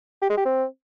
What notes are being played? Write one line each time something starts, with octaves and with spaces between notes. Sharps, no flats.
G4
G#3
G4
C4